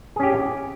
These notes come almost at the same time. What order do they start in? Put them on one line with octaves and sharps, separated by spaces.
G#4 C#4 G4